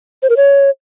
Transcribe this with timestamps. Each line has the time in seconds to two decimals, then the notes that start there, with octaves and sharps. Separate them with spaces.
0.23 C5
0.30 A#4
0.37 C#5